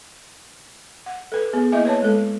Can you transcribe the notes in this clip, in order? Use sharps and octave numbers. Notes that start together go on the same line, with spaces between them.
F#5
A4 B4
B3 G#4
A#3 E4 D#5 E5 G#5
B4 C#5 A5
G#3 A4